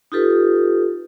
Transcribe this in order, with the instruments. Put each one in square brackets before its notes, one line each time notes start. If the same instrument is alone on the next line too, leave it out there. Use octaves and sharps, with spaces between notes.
[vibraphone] D#4 F4 G4 A4 B4